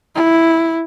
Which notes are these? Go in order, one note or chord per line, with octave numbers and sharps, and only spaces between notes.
E4